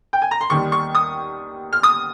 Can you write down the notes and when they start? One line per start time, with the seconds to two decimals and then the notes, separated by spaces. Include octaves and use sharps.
0.13 G5
0.22 G#5
0.31 A#5
0.41 C6
0.50 D#2 D#3 G3 C#6
0.72 C#6
0.95 D#6
1.73 F6
1.83 D#6